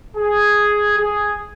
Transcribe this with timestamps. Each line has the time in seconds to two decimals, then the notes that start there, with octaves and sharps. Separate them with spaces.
0.16 G#4
0.98 G#4